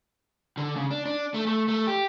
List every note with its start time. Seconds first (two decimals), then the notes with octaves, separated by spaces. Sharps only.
0.57 D3
0.76 C#3
0.91 D4
1.05 D4
1.34 A3
1.47 A3
1.68 A3
1.87 G4